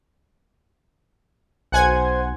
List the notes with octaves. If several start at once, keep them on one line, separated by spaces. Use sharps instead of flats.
B1 C5 F#5 G#5 G#6